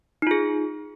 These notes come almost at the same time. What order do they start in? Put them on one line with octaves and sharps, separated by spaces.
D#4 F4 G#4